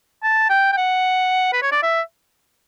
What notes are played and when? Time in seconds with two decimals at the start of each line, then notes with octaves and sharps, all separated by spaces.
0.23 A5
0.50 G5
0.72 G5
0.77 F#5
1.53 B4
1.62 C#5
1.72 D5
1.83 E5